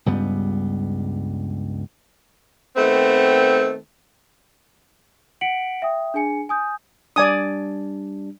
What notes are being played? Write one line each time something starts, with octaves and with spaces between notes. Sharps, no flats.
C#2 G2 G3 B3
D#3 A3 B3 C4
F#5 B6 C#7 D7 F#7
E5 G5 D#6
D4 G#4 G#5 C#7
G#5 D#6 G6
G3 D4 D5 G#5 D#6